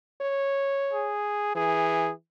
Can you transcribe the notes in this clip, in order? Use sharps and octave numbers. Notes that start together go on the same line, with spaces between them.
C#5
G#4
E3 G#4